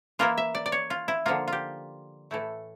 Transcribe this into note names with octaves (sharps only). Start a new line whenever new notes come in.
E3 A#3 E4 F4
E5
D5
D5
C#5
F4
E4
D3 F3 A#3 F4
F4 G4
A2 E3 A3 E4 A4